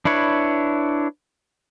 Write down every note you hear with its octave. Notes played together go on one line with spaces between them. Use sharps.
D4 E4 B4 C#5